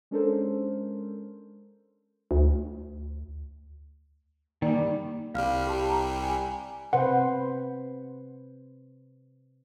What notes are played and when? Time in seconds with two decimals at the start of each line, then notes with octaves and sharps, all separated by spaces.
0.11 G#3 C#4 D4 A4 A#4 C5
2.31 D2
4.62 D#3 G3 A#3 D5
5.35 C2 G3 F5 F6
5.67 G4 A5
5.89 A#5
6.23 G#5
6.93 C3 B4 C5 F#5